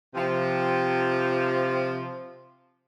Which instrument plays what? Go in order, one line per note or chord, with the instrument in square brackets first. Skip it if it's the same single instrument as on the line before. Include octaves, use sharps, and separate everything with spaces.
[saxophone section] C3 F3